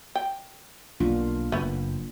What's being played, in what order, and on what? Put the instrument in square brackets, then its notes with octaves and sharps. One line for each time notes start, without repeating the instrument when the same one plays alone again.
[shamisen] G5
[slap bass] B1 [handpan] A#3 D4 F4
[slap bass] F#1 [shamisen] A3 B3